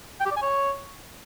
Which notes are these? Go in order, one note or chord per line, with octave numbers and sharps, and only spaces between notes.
G5
G4
D5
G#5
C#5